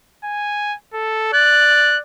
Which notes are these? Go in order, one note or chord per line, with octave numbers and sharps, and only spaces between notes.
G#5
A4
D5 F#6